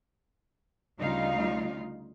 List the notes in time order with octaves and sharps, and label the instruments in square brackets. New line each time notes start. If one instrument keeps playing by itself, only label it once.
[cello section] D2 C#3 G3 D#4 F4 F5